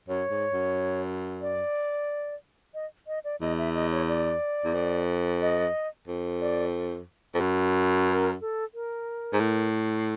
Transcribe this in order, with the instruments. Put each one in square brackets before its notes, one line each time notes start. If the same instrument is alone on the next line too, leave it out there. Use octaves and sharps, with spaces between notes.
[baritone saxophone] F#2 [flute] C#5
[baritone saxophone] G#2
F#2
[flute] D5
D#5
D#5
D5
[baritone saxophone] E2 [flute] D#5
[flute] E5
D#5
C#5
D5
[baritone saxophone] E2
F2
[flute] D#5
[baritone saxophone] F2
[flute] D5
[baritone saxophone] F2
F#2
[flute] A#4
A4
A#4
[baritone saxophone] G#2
A2